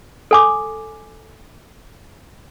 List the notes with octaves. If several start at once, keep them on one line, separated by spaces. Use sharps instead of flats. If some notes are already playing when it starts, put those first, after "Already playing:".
A4 G#5 D6